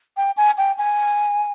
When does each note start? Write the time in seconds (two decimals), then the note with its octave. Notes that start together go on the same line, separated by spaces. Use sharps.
0.17 G5
0.37 G#5
0.58 G5
0.78 G#5